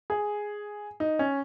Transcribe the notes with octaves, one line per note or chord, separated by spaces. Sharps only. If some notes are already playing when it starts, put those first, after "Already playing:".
G#4
D#4
C#4